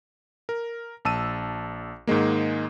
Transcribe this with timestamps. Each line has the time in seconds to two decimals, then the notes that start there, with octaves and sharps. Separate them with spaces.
0.49 A#4
1.05 A#1 A5 E6 D#7
2.07 G#2 D#3 G#3 A#3